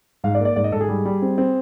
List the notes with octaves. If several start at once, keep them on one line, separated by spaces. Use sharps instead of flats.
G#2 F5
D5
A#3
D5
G#2 D5
D#5
G#2 A4
G#4
G3
G3
C4
C4